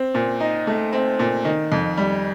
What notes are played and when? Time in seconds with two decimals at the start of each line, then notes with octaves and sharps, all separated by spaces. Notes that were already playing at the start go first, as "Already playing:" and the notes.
Already playing: C4
0.15 A#2
0.40 D#4
0.67 A3
0.93 C4
1.19 A#2
1.45 D#3
1.72 F2
1.97 G3